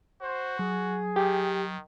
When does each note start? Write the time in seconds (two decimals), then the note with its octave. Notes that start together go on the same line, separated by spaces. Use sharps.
0.21 F#4 C5
0.59 F#3 G#4
1.16 D#3 G4